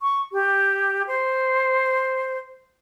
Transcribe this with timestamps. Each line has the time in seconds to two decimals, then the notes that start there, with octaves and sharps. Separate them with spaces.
0.01 C#6
0.33 G4
1.07 C5